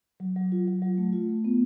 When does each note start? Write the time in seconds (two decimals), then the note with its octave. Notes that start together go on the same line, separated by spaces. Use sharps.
0.20 F#3
0.36 F#3
0.52 F4
0.67 F#3
0.82 F#3
0.98 A3
1.13 F4
1.29 A3
1.45 B3